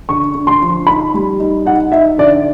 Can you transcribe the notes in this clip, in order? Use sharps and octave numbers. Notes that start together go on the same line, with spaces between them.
D3 C#6
D3
C6
F3
D#4 B5
G3
D#4
D#4 F#5
D#4 E5
D3 D5